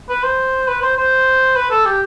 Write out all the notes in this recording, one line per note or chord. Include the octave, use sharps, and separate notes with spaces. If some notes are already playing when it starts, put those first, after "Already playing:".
B4
C5
B4
C5
C5
B4
A4
G4